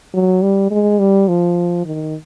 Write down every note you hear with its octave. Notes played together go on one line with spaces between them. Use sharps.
F#3
G3
G#3
G3
F3
D#3